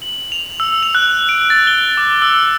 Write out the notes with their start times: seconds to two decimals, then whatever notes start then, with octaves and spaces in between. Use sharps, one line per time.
0.02 F#7
0.32 F7
0.60 E6
0.83 F7
0.95 F#6
1.29 D7
1.50 A6
1.67 G7
1.97 D6
2.22 E6